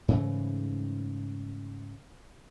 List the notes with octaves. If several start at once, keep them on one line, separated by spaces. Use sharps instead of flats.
G#2 C#3 E3 A3